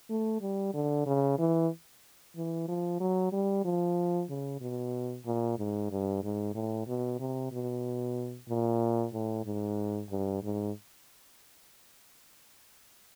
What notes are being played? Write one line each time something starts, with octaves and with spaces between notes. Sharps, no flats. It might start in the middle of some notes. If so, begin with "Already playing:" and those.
A3
G3
D3
C#3
E3
E3
F3
F#3
G3
F3
C#3
B2
A#2
G#2
G2
G#2
A2
B2
C3
B2
A#2
A2
G#2
G2
G#2